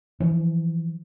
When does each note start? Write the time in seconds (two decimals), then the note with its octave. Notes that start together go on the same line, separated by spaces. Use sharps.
0.20 E3 F3